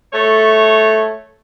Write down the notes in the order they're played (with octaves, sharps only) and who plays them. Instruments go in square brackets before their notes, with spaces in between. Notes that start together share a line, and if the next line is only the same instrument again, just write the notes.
[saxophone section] A3 C#5